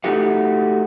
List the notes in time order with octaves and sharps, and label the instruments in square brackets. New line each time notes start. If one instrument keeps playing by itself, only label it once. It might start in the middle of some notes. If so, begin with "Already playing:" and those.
[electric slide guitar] A3 D#4 F#4 G4 F#5